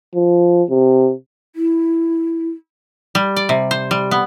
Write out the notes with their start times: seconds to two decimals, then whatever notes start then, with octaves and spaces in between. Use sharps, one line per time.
0.15 F3
0.70 C3
1.56 E4
3.15 G3
3.36 D5
3.49 C3
3.71 C5
3.91 G3
4.11 B3